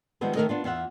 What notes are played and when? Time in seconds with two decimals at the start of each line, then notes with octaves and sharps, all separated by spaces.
0.21 D#3 F3 G3 G#3 B3 C4
0.35 D#3 F3 A3 A#4 C#5 D#5
0.49 B3 D4 F4
0.64 E2 F4 E5 F#5